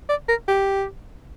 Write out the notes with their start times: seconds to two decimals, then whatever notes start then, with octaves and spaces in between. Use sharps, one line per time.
0.09 D5
0.29 A#4
0.48 G4